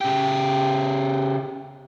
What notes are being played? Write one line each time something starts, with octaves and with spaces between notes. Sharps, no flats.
C#3 G4